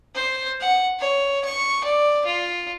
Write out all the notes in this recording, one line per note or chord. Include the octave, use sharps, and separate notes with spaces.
C5
F#5
C#5
C#6
D5
F4